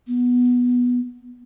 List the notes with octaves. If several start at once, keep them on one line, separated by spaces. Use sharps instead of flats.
B3